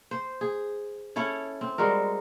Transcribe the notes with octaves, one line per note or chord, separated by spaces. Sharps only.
C5
G#4
C#4 E4 A4 C#5
C4
G3 G#3 F#4 A#4